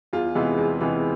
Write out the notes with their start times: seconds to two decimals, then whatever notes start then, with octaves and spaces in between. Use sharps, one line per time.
0.13 E2 F4
0.35 C3 E3 G#3 B3
0.58 E2
0.81 C3 E3 G#3 B3